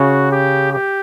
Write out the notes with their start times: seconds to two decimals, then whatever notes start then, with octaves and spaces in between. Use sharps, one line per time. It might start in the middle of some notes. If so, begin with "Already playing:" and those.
Already playing: C#3 F#4
0.31 G4
0.71 G4